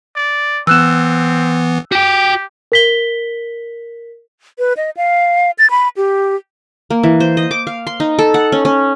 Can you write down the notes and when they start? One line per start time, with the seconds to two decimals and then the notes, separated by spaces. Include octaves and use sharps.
0.16 D5
0.67 E3 B3 C4 E6 F#6 E7
1.92 F#4 G4 G5
2.72 A#4 B6 G7
4.59 B4
4.77 D#5
4.97 F5
5.58 A6
5.70 B5
5.97 G4
6.90 A#3
7.03 E3
7.20 C5
7.37 D#5
7.51 D6
7.67 F5
7.87 C6
8.00 D#4
8.19 A4
8.34 F#5
8.52 C#4
8.65 C#4